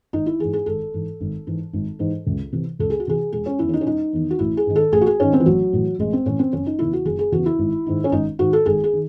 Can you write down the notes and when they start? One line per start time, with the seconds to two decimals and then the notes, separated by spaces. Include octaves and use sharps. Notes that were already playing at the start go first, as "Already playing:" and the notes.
0.13 G#1 D#4
0.26 E4
0.39 E3 G#4
0.45 G#2
0.53 G#4
0.66 G#1 A4
0.94 G#2 E3
1.20 G#1
1.47 G#2 E3
1.73 G#1
1.99 G#2 E3
2.27 C#2
2.52 C3 E3
2.79 C#2 A4
2.90 G#4
3.00 F#4
3.07 C3 E3 G#4
3.32 E1 G#4
3.46 C#4
3.59 E2 D#3 E4
3.69 C#4
3.73 D#4
3.81 C#4
3.86 E1 D#4
4.13 E2 D#3
4.30 F#4
4.39 A1 E4
4.57 G#4
4.67 G#2 D#3
4.76 A4
4.92 A1 G#4
5.01 F#4
5.07 G#4
5.20 G#2 D#3 C#4
5.33 C4
5.40 E3
5.46 A1 F#3
5.73 A2 E3
5.99 A1 G#3
6.13 C4
6.25 A2 E3 C#4
6.39 C4
6.53 F#1 C#4
6.66 D#4
6.79 E2 C#3 E3 E4
6.93 F#4
7.05 F#1 G#4
7.19 G#4
7.32 E2 C#3 E3 F#4
7.46 E4
7.59 G#1
7.86 G#2 D#3
8.04 C#4
8.12 G#1 D#4
8.39 G#2 D#3 F#4
8.53 A4
8.66 G#1 G#4
8.84 G#4
8.93 D#3